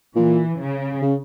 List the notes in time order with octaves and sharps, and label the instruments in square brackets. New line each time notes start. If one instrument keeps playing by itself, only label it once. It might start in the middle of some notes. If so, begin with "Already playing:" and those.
[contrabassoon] A#2 [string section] E3
[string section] C#3
[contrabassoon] C#3